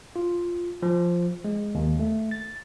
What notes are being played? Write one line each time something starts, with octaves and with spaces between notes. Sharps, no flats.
F4
F3
G#3
D#2
A3
A6